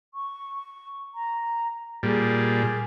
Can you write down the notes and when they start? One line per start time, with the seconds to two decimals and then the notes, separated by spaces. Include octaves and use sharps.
0.14 C#6
1.14 A#5
2.03 A#2 G3 G#4